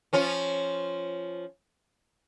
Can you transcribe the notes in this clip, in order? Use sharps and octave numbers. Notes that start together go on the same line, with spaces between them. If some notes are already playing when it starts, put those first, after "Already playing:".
F3 C#4 F4